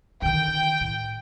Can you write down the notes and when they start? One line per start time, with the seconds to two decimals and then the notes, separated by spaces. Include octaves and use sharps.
0.22 D3 D#3 G5
0.81 A2